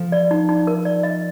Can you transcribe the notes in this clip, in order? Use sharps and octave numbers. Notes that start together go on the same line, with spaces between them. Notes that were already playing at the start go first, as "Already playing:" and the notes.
Already playing: F3
D5
D#4
D#4
A#4
D5
D#5